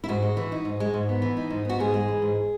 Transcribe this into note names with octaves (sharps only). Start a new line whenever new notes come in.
E4
G#2 F#4
G#3
E3
D#4
G#2
G#3
G#2
B3
E3
D#4
G#2
B3 F#4
G#2 G#4
G#3
E3
G#2